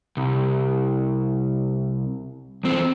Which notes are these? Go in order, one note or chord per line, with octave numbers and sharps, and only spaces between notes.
C2
E2 C4